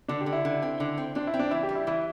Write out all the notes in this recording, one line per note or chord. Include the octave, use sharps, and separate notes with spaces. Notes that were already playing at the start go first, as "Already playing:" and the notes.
D3 D4
G4
D3
E4
D3
C4
D3
C4
C4 D4
E4
C4
D4
E3 E4
G4
G3
E4
E3 E4